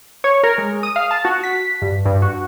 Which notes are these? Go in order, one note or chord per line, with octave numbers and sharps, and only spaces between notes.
C#5
A#4
G#3
D#6
F5
A5
F#4
B6
G2
G2
F#4